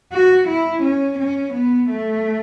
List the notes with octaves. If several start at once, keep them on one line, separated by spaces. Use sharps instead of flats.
F#4
E4
C#4
C#4
B3
A3